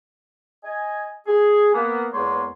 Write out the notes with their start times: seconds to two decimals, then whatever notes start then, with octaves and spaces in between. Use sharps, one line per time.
0.64 D#5 G#5
1.27 G#4
1.74 A#3 B3
2.13 E2 G#3 A#3 B3 C#5 C6